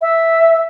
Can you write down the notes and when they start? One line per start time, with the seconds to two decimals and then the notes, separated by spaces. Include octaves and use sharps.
0.02 E5